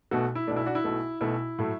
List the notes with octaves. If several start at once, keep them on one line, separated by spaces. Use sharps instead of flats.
B1 B2 A3 F#4 A4
E4
B1 B2 A3 D4
E4
D4 F#4
E4
B1 B2 A3
B1 B2 A3 E4
A2 F#3 A3